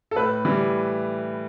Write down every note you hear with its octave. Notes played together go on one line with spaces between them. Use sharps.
A4
A2 B4
E3 G3